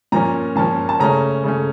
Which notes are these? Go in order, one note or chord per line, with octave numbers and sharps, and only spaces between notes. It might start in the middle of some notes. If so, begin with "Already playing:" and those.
A#2 F3 A#3 C#4 A#5
A#2 F3 A#3 C#4 A5
A5
C#3 A3 C#4 A#5
C#3 A3 C#4